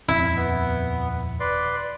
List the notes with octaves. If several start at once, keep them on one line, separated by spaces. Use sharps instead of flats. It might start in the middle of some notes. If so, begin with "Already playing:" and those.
D#1 F2 C4 E4
B3
B4 D5 C6